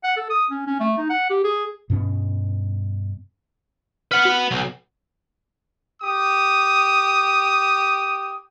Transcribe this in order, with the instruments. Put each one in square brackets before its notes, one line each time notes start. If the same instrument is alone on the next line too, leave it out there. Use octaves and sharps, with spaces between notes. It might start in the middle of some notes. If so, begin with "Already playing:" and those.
[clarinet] F#5
A4
D#6
C#4
C#4
A3
D#4
F#5
G4
G#4
[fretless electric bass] G2 B2 C4 C#4
[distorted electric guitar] B4 F#5 [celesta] F6
[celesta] F#4
[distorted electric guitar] B1
[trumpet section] G4 D#6